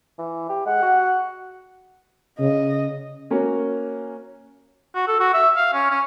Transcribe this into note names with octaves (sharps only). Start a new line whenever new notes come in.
E3
G4
G#3 F#5
F#4
C#3 D#5
A#3 C#4 F#4
F#4
A4
F#4
E5
F5
C#4
C#4